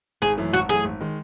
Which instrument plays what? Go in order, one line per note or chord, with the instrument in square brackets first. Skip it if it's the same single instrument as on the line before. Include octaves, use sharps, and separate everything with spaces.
[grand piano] G#1 [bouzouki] G#4
[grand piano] F#2 E3 A3
[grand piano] G#1 [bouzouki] F#4
[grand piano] F#2 E3 A3 [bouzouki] G#4
[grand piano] G#1
D#3 G#3